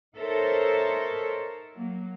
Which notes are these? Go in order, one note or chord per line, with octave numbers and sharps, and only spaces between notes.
D#4 A4 A#4 C5 C#5 E5
F#3 A#3